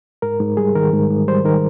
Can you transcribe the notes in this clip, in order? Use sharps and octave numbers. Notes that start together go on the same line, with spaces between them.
G#2 A#4
G#2
G3 G#4
D#3 A#4
G#2
G#2
G3 C5
D#3 A#4